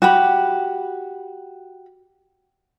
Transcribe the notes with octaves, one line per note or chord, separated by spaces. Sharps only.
F#4 G4 B5